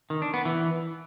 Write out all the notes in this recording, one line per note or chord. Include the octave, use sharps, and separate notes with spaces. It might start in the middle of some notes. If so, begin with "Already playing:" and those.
D#3
D4
B3
E3